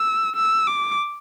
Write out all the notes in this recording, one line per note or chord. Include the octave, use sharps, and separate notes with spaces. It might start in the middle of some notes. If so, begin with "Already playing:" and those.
Already playing: E6
E6
D6